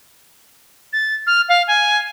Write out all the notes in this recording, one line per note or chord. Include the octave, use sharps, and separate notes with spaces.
A6
F6
F5
G#5